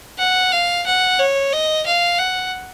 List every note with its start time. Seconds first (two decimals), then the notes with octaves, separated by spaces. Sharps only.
0.18 F#5
0.52 F5
0.86 F#5
1.19 C#5
1.52 D#5
1.86 F5
2.19 F#5